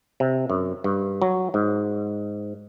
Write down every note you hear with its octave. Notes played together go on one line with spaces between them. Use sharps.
C3
F#2
G2
F#3
G#2